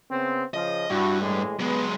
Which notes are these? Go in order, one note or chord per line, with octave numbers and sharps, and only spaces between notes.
C#3 B3 C4
C#3 F3 D#5
G2 D4 E4 F#4
A2 E3 G#3
F#3 G#3 B3